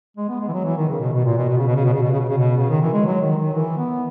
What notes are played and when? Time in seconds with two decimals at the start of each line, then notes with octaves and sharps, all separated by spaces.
0.17 G#3
0.29 B3
0.41 G#3
0.48 E3
0.53 F#3
0.65 E3
0.77 D#3
0.89 C#3
1.01 B2
1.13 B2
1.25 A#2
1.37 B2
1.49 B2
1.58 C#3
1.67 B2
1.76 C#3
1.85 B2
1.94 C#3
2.03 B2
2.12 C#3
2.20 B2
2.29 C#3
2.38 B2
2.57 C#3
2.70 D#3
2.81 E3
2.93 G#3
3.05 F#3
3.21 D#3
3.37 D#3
3.54 E3
3.78 B3